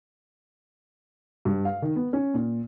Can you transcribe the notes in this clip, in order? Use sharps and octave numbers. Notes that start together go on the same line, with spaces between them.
G2
F5
D#3
B3
C#4
A#2